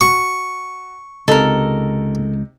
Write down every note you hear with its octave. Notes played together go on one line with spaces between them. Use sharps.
F#4 C#6
C#2 C3 D#4 A4 A#4